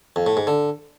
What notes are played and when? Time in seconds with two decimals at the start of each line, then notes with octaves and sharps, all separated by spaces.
0.16 F2
0.26 A2
0.37 G#2
0.47 D3